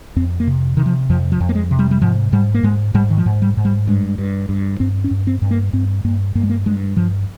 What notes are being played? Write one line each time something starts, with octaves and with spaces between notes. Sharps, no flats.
F2 C4
A#3
C3
C3 D#3
F3
F2 F3
F3
F2
A#3
G#3
C3
G3
G3
G#2 F3
G#2 G3
A#3
G#2 G#3
G#2 G3
D#3
F3
G#2
G3
G#2
G3
G2 G#3
G2
G2
G2 C4
C#4
G2
C4
G2
A#3
G2 C4
G2 A#3
G2 A#3
G#3
A#3
G2 G#3
G2 F3